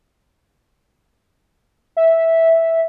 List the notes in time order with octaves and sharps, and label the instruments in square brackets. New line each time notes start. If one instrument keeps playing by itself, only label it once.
[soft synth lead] E5